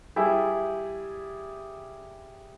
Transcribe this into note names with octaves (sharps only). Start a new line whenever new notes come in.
G3 E4 G4 G#4 E5